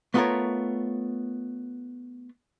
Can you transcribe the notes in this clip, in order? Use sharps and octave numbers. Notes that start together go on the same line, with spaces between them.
A3 B3 F4 F#4 A#4 C#5